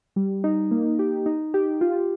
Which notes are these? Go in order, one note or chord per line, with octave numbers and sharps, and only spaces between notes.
G3
D#4
A#3
G4
D#4
G4
F4